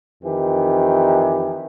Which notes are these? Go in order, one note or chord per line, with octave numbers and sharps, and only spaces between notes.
F2 D#3 E3 G4